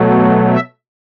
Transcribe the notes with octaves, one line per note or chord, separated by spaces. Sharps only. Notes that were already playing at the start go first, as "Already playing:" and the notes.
Already playing: B2 F#3 A3
E5